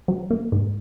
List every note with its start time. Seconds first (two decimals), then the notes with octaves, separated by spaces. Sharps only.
0.08 F#3
0.31 A#3
0.52 G#2